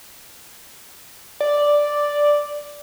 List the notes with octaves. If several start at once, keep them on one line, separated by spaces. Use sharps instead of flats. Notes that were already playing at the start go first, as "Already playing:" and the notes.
D5